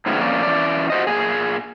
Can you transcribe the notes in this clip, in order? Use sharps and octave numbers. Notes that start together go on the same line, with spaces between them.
A2 D#3 F3 G#3 B3 C#4
F2 A#3 C#4 D5
E3 C#4 D5
F#4 C5 D#5
A#2 G#4